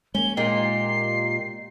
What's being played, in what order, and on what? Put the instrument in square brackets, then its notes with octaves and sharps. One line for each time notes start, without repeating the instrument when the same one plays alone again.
[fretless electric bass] G#3 A#3 [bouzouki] C#4 [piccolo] G7
[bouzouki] A#2 D#4 G4 [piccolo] C7